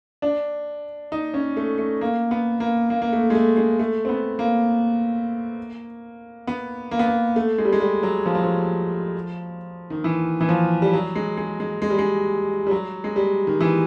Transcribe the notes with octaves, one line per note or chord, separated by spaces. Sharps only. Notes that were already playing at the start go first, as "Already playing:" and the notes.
D4
D#4
C#4
A3
A3
A#3
B3
A#3
A#3
A#3
A3
G#3
A3
G#3
A3
C4
B3
A#3
B3
A#3
B3
A#3
A3
G#3
G3
G#3
G3
F#3
F3
F#3
F3
D#3
E3
E3
F3
G3
F#3
G#3
G#3
G#3
G#3
G3
G#3
G3
F#3
G#3
G3
D#3
E3